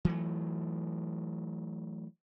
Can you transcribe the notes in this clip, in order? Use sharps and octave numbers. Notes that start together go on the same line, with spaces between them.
E3 F#3 A3